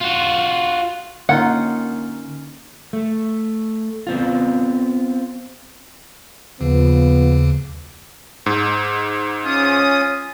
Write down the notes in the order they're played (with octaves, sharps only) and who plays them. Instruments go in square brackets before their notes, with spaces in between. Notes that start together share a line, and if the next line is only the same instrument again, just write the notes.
[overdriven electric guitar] F4 F#4
[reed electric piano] D3 [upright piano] A#3 [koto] C#4 D#4 F4 [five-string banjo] F#5
[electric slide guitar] A3
B3 C4 F4
[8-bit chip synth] D#2 C#3 [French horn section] F3 B3
[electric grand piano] G#2
[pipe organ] C#4 D#6 [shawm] F4